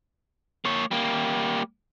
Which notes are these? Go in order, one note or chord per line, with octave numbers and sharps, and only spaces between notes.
A#3 C#5
G3 A#3